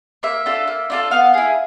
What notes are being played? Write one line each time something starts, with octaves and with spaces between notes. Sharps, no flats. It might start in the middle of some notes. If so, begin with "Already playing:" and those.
A#3 E5
D4 F4 A4
A#3
D4 F4 A4
B3 F5
E4 G#4